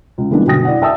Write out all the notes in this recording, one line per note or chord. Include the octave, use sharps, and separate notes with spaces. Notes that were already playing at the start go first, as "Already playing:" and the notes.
C#2
E3 G3 G#3 A#3 B3 D4
G1 B2 F#3 G5 D#6 A#6
E4 D5 F#5
E5 G5 A5 D#6 E6